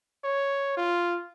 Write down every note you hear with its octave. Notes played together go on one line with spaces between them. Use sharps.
C#5
F4